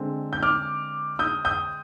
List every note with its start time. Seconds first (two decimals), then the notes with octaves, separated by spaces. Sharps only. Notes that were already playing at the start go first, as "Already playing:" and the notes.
Already playing: D3 G#3 C4
0.33 G6
0.43 D6 F6
1.19 D#6 G6
1.45 D#6 G6